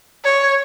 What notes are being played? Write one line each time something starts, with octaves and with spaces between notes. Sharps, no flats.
C#5